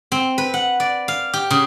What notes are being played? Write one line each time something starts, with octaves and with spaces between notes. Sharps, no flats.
C4
B4
F#5
D5
F5
G4
C#3